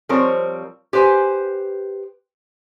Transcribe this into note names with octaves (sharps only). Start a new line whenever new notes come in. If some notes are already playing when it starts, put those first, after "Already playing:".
F3 G3 C4 A#4 C#5
G4 B4 C5 G#5